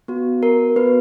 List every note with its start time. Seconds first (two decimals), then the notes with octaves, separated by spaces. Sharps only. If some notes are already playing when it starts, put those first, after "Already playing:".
0.08 B3 F#4
0.43 A#4
0.76 B3 F#4 B4